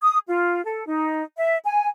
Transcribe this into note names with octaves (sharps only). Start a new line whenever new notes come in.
D#6
F4
A4
D#4
E5
G#5